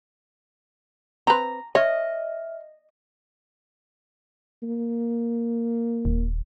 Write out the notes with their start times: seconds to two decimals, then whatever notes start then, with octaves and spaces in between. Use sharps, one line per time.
1.27 C4 B4 A#5
1.75 C#5 D#5 E5 F6
4.63 A#3
6.05 D#1